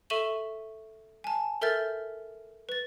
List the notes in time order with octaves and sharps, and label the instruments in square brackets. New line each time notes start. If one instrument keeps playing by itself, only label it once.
[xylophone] A4 E5 C#6 D#7 E7 F#7
G#5 A5
A4 A#4 E5 F6 G6 A6
B4 A6